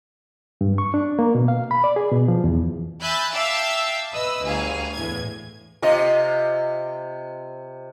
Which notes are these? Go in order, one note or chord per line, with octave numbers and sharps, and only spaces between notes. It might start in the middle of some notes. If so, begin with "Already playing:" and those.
G2
C#6
D4
A#3
B2
F5
B5
D5
G#4
B2
F3
E2
E5 G#5 B5 F#6 G6 A6
E5 F5 G5 A5 D6 E6
B4 D#5 D#6 E6
G1 D2 G#4 F5 G#5
E2 A2 G#6
C3 F4 D#5